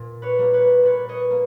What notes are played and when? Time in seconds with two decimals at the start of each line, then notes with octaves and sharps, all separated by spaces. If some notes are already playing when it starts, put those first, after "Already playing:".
Already playing: A#2
0.22 B4 C#5
0.38 G3 A#3
0.53 B4 C#5
0.83 A#2 B4 C#5
1.09 C#5 D#5
1.31 A#3